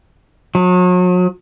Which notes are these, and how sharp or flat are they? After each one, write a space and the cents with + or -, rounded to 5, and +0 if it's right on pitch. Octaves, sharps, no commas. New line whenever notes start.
F#3 -40